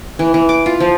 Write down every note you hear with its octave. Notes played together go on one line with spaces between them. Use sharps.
E3
E3
D6
F4
F3